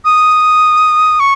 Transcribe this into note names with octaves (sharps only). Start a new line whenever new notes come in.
D#6
C#6